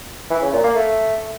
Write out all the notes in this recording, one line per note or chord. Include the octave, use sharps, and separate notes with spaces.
E3
C#3
A#2
A#3
A3